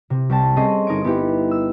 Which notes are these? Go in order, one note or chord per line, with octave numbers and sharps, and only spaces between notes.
C3
C2 G5 A5
C4 C#4 G#4 A4 C5 D#5
G1 D#4 A#4 G#5 D7
B3 D#4 E4 G4
E6